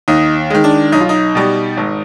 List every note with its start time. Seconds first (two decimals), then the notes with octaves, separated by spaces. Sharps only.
0.08 D#2 D#4
0.50 D#3 G#3
0.64 D4
0.92 B1 D#4
1.01 F4
1.09 D#4
1.35 B2 G3
1.77 G#1